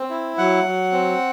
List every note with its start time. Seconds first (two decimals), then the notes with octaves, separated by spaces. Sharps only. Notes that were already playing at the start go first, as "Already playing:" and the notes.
Already playing: C4
0.10 E4
0.38 F#3 F#5
0.64 F#3
0.92 C4